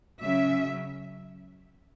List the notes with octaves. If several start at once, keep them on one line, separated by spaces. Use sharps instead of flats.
C#3 F#3 C#4 E5